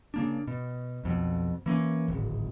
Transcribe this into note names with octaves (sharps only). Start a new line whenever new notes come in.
C#3 A#3 D4
B2
B1 F2 B2
E3 A#3 C#4
D1 G#1